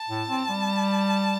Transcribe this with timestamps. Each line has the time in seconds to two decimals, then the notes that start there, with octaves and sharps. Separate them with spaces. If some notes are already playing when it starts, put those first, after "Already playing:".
Already playing: A5
0.09 A2
0.29 C4
0.49 G3